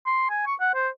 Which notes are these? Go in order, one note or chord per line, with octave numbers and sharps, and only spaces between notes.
C6
G#5
C#6
F#5
C5